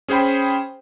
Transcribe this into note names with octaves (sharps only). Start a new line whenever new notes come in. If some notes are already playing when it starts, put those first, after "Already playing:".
C#4 G#4 C5 G5 B5